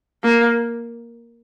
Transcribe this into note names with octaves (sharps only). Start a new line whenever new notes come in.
A#3